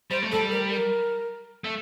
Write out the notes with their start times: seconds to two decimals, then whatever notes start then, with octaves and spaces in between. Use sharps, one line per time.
0.11 G3 C5
0.22 A3
0.32 G3 A4
0.51 A#4
0.72 A#4
1.64 A3